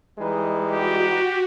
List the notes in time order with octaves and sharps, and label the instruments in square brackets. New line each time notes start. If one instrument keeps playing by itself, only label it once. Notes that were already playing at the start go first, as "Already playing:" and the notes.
[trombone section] E3 G3 G#3 [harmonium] D#4 B4
[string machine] F#4 [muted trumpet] G4